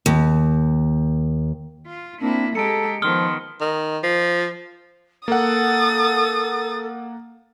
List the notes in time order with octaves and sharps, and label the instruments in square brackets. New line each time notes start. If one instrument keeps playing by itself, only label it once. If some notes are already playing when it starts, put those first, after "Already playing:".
[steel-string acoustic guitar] D#2
[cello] F4
[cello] A#3 E4 [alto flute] C4 [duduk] D4
[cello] G#3 G4 [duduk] A4 [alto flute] A#5 [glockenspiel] C#7 D7
[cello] D#3 B3 [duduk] F3 [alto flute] C6 [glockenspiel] D#6 F6 G7
[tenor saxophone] D#3
F3
[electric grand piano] A#3 F#5 [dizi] A4 [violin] D#6 A6